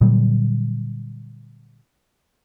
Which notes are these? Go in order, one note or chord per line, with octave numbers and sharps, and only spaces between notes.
A#2 D3 F#3 G3